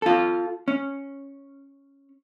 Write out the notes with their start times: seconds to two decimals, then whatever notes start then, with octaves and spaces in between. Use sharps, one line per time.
0.02 F4 A4
0.68 C#4